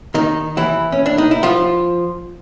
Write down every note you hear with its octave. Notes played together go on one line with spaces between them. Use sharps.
D#3 D#4
E3 E4
C#4
D4
D#4
E4
F3 F4